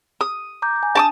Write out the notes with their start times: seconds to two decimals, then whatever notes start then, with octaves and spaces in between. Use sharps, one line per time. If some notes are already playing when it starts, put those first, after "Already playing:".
0.21 D#6
0.62 A#5 D6 G6
0.83 G#5
0.95 D4 A5 D6 D#6